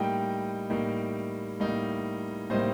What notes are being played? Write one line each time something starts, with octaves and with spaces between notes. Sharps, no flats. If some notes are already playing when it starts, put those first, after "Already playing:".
Already playing: A2 G3 A#3 D#4 D#5 G5
A2 G3 A#3 D#4
A2 G3 A#3 D#4
A2 G3 A#3 D#4 C5 D#5